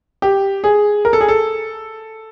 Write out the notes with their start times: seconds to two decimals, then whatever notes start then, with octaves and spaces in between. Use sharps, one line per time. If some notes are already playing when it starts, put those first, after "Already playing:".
0.22 G4
0.64 G#4
1.05 A#4
1.13 A4
1.21 G#4
1.28 A4